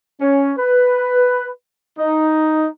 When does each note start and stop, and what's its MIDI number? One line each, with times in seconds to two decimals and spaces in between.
0.21 0.52 61
0.58 1.48 71
1.98 2.68 63